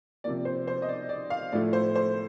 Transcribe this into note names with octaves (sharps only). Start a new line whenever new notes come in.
C3 F3 A#3 D5
C5
C5
D#5
D5
D5
F5
A2 F3 A3 D5
C5
C5